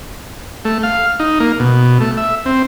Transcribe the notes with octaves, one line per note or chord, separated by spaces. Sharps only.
A3
F5
D#4
A#3
B2
A3
E5
C4